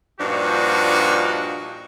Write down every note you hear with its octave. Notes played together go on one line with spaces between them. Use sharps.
G2 A#2 F3 D4 D#4 F#4